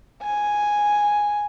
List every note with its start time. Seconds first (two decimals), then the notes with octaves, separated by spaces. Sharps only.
0.22 G#5